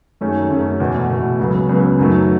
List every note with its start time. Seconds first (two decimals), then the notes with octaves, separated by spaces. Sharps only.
0.21 F#2 D#3 A3 C#4 G#4
0.50 F#2 D#3 A3 C#4 G#4
0.80 E2 B2 A3
1.10 E2 B2 A3
1.39 C#2 C#3 F#3 B3
1.69 C#2 C#3 F#3 B3
1.99 F#2 D#3 F#3 A3